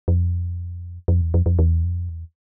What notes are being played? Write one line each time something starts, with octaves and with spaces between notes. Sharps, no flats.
F2
F2
E2
F2
F2
E2
F2
E2